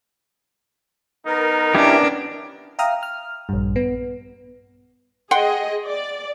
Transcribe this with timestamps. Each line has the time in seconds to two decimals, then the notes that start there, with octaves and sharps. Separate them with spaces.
1.26 B3 D#4 A#4
1.75 C#4 D4 E4 G4
2.79 E5 F5 G5 A#5 D#6 F6
3.03 F6
3.49 A#1 G2
3.76 B3
5.31 G#4 D#5 F#5 G5 C6
5.87 D5